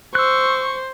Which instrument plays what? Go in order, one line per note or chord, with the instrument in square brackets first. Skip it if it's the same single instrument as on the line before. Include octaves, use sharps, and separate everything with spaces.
[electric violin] C5 [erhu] C#6 [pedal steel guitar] E6 F#6